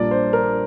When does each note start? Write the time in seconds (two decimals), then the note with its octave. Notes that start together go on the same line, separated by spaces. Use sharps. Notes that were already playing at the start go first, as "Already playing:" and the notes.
Already playing: A#1 A#2 G3 A#3 D4 D5
0.11 C5
0.33 A#4